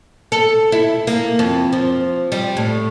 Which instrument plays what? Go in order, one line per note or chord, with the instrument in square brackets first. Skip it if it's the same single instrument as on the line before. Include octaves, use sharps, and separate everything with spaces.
[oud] A4
E4
A#3
F2
F3
G3
A2